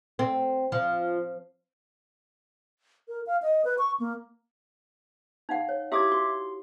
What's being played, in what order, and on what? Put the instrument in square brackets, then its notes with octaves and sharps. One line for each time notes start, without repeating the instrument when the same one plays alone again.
[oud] C4
F3
[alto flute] A#4
F5
D#5
B4
C#6
A#3
[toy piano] D#4 F5 F#5
C#5
[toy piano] E4 G4 D#6 [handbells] E5 D6 G#6
[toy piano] F#4 [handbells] C6